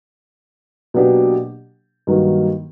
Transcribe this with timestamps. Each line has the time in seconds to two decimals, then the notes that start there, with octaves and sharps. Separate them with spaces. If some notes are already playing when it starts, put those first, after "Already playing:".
0.94 B2 F#3 A#3 D4 G4
2.07 G2 D#3 F#3 A#3